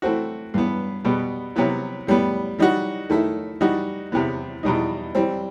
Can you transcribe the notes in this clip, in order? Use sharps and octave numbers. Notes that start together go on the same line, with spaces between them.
E3 A3 C4 F#4
G2 E3 B3
B2 G3 B3
C3 F#3 B3 E4
A2 G3 B3
E3 G3 D#4 F#4
D#3 A3 E4
E3 G3 D#4 F#4
E2 C3 E3 B3
E2 B2 G3 D#4
E3 G3 C4